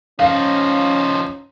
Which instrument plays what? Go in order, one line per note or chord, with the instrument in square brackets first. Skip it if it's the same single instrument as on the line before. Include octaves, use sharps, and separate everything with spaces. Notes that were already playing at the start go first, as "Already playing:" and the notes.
[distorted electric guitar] F3 D#4 [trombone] C#4 [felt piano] F5